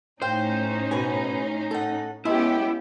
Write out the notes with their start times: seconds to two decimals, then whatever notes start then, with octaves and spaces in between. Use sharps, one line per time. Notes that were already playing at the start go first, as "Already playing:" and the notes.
0.22 A2 C#4 D#4 C5 F5 G5
0.91 B2 B4 G#5
1.71 A4 F#5
2.25 G#3 B3 C#4 E4 G4